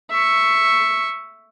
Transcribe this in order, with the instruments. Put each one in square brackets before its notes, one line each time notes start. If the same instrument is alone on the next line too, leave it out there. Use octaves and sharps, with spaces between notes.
[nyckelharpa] E5 C#6